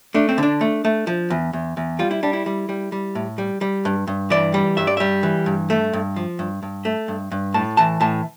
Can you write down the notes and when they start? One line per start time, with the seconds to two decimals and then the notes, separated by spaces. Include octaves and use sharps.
0.14 A3 D4
0.29 C4
0.38 D3 D4
0.61 A3
0.85 A3
1.07 F3
1.30 E2
1.53 E2
1.77 E2
1.99 G3 F4
2.11 E4
2.23 G3 D4
2.33 E4
2.46 G3
2.69 G3
2.92 G3
3.15 A2
3.38 G3
3.61 G3
3.85 G2
4.07 G2
4.30 E3 D5
4.54 G3
4.77 G2 E5
4.87 D5
4.97 G3 E5
5.23 E3
5.46 G2
5.70 A3
5.93 G2
6.16 F3
6.39 G2
6.63 G2
6.85 A3
7.08 G2
7.31 G2
7.54 A2 A5
7.77 E3 A5
8.01 A2 A5